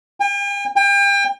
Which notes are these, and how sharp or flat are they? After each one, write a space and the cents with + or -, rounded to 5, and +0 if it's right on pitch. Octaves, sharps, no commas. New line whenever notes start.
G5 +45
G5 +35